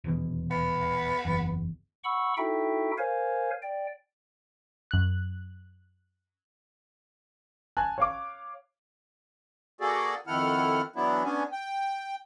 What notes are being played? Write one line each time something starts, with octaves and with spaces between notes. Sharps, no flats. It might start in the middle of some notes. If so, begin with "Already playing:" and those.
D#1 E2 B2
B3
F#1 E2
F#5 B5 C#6 E6
D#4 E4 F#4 A4 E5 G5
A#4 C5 C#5 F5 G#5
D5 G5
F#2 F#6
G#5 A5 F#6
C#5 F5 D6
A#3 F#4 G#4 A4 D5
F2 D#3 E4 A4 F#5 F6
E3 F#3 B3 D4 E4
B3 C#4 D4 G#5
G5